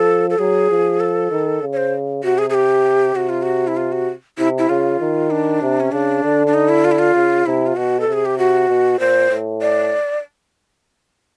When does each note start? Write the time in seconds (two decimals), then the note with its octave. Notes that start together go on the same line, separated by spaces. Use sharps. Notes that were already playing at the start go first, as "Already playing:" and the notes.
Already playing: F3 A4
0.30 A4
0.39 F#3 G#4
0.70 F3
1.00 A4
1.31 D#3
1.62 C#3
1.73 C#5
1.77 C5
2.24 C3 F#4
2.38 G#4
2.50 G#4
2.54 G4
3.16 C3 F#4
3.29 F4
3.43 F#4
3.68 E4
3.77 F4
3.92 F#4
4.38 C3 E4
4.58 E4
4.69 C#3 F4
5.00 D#3
5.31 D4
5.62 C3
5.80 C#4
5.92 C#3 D4
6.23 D3
6.47 D4
6.54 D#4
6.69 E4
6.85 F4
6.91 E4
6.99 F4
7.15 C#3
7.46 C3 E4
7.67 F4
7.76 B2 F#4
8.00 A4
8.07 C3
8.13 G#4
8.25 G4
8.38 F#4
8.69 B2
8.99 A#2 C5
9.30 A2
9.61 D5